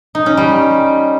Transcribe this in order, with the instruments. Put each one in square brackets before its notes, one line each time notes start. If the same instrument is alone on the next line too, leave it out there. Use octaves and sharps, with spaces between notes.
[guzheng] D#4
C#4
G3